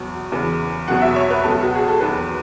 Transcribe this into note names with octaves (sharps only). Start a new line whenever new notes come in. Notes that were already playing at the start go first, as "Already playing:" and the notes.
Already playing: E2 B2 F#3
E2 C#3 E3
E2 B2 F#3 F#5
E5
C#5
B4
C#2 B2 F#3 A4
F#4
G#4
A4
E2 D#3 F#3 B4